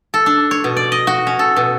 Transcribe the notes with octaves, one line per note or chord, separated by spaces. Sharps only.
A4
D4
C#5
B2
D5
D#5
F#4
C#4
A4
B2